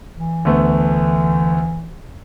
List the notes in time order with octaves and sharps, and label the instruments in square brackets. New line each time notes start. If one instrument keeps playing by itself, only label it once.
[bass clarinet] E3
[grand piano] D2 A3 B3